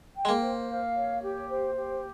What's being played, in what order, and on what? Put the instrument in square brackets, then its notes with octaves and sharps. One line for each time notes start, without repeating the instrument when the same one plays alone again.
[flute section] G5
[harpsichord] G#3
A#3
[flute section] C5
F5
C#5
G4
C5
G4